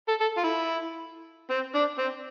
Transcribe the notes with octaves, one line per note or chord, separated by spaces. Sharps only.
A4
A4
F4
E4
C4
D4
C4